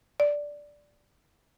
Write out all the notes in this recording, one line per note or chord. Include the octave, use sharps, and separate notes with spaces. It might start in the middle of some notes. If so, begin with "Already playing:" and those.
D5